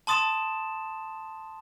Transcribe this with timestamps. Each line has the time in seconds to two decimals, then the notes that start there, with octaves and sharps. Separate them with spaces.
0.07 A5 C6 D#6 A6 E7